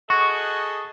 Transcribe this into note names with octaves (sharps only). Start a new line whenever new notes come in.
F#4 G#4 A4 D#5 C#6